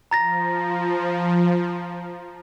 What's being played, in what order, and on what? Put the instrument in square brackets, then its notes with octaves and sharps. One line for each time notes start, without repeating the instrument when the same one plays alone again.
[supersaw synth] F3 [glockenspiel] A#5 A6 A#6